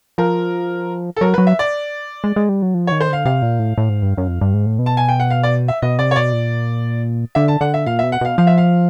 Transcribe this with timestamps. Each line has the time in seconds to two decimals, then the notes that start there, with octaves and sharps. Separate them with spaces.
0.18 F3 A#4
1.17 A4
1.21 F#3 A#4
1.34 B4
1.38 F#3
1.47 E5
1.59 D5
2.24 G#3
2.36 G#3
2.49 G3
2.62 F#3
2.74 F3
2.87 C#5
2.92 D#3
3.00 C5
3.09 D3 F5
3.25 C3 F5
3.42 A#2
3.59 A2
3.78 A2
3.89 G#2
4.02 G2
4.17 F#2
4.28 F2
4.41 G2
4.54 G#2
4.66 A2
4.79 B2
4.86 A5
4.97 G#5
5.09 G5
5.20 F#5
5.30 F5
5.43 D5
5.68 E5
5.82 B2 D#5
5.99 C3 D5
6.11 C#5
6.16 B2 D5
6.33 A#2
7.35 D3 E5
7.48 A5
7.61 D3 F#5
7.74 E5
7.86 A#2 F5
7.99 E5
8.03 B2
8.12 F#5
8.21 B2 F5
8.38 F3 F5
8.47 E5
8.58 F5